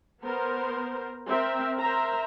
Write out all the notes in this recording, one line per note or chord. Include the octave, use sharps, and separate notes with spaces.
B3 A#4 C5
C4 A#4 E5
A#4 C5 E5 A#5